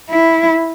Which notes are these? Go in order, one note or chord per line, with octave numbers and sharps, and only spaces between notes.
E4